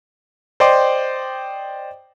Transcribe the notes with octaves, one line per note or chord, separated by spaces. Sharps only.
C5 D5 D#5 G5 C6 D6